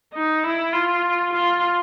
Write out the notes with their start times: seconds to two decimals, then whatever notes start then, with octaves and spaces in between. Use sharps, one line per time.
0.13 D#4
0.43 E4
0.73 F4
1.34 F4